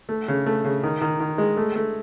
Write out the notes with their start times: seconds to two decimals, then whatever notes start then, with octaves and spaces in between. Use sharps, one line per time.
0.09 A3
0.28 C#3
0.46 A3
0.65 C#3
0.83 D#3
1.01 D#3
1.20 D#3
1.38 G#3
1.57 A3
1.76 A3